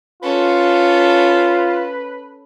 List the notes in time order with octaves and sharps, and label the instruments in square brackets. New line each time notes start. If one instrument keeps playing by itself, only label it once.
[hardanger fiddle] C#4 A4 [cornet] F4 [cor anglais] B4